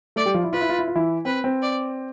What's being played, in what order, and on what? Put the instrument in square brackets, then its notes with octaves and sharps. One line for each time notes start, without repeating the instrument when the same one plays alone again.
[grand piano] A3 A4 [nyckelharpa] D5
[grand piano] G3 G4
F3 F4
E4
[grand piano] F4 [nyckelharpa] B4
[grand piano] E4
F4
E4
F4
E3 E4
[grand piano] C4 [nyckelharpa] B4
[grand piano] C4
[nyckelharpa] D5